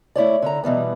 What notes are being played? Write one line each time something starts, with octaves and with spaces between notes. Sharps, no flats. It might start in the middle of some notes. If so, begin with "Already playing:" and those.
A3 E4 C#5 D5
D3 E4 A#5
B2 E3 G3 B3